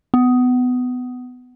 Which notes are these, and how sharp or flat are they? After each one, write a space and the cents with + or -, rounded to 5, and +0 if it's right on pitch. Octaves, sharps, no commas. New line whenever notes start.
B3 +20